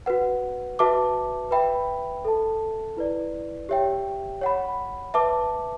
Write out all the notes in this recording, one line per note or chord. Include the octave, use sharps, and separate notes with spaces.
F#4 B4 F#5
F#4 B4 E5 A5 D6
B4 E5 G5 B5
A4 E5 A5
E4 B4 D5
G4 C#5 E5 G5
C#5 F#5 B5
B4 E5 A5 D6